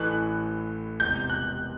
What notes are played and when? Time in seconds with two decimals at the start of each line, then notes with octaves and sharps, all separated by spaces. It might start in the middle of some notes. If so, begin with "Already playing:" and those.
Already playing: A1 A2 E3 A3 F#6
1.00 E1 E2 C3 G6
1.30 F#6